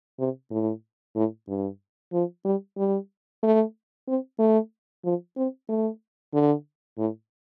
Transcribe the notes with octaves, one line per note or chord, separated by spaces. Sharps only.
C3
A2
A2
G2
F3
G3
G3
A3
C4
A3
F3
C4
A3
D3
A2